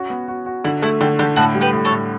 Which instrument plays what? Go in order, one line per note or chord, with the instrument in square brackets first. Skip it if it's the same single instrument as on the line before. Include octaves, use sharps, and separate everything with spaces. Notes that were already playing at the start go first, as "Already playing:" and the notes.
Already playing: [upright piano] C#4 F#4
B3
F#4
F#4
[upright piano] D3 [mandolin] E4
[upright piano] A3 [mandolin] E4
[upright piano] D3 [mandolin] G4
[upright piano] D3 [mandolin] G4
[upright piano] A2 [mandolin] F#4 A4
[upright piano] G3
[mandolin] G4 B4
[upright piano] A2
[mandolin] A4 C#5
[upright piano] A2